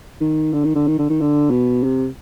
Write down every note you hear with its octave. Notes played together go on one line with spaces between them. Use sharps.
D#3
D3
D#3
D3
D#3
D3
D#3
D3
B2
C3